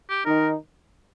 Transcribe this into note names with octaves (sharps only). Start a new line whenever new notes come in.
G4
D#3 D#4 A#4